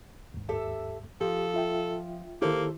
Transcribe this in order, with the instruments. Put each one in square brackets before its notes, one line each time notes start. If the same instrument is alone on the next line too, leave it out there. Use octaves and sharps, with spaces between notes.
[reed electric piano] D#2 G#2
[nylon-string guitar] G4 A4 E5
[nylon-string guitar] F3 [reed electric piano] G4 [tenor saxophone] A4
[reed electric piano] F4 E5 G5
[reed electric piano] D#3 E4 [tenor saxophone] A#3 [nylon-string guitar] G4 A4 C5